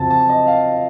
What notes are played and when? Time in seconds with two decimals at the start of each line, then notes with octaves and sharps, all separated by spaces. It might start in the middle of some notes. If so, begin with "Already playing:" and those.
Already playing: F2 C#3 F#3 C4 A5
0.10 A5
0.29 D#5
0.47 F5